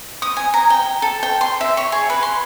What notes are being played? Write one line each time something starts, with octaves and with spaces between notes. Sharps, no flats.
D#6
G#5
A#5
G5
A4
G5
C6
E5
C#5
G#4
B4
C6